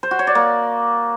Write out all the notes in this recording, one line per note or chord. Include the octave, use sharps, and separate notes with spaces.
C5
F#4
C#5
D5
A#3